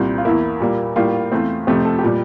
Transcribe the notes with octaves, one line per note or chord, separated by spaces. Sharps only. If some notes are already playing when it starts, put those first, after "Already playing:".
Already playing: C2 A#2 G3 C4
F4
E2 E3 A#3 E4
A#2 G3 A#3
A2 G3 A#3 F4
E2 E3 A3 C4
F2 C3 F3 A3 C4 G4
A4
G4
A#2 G3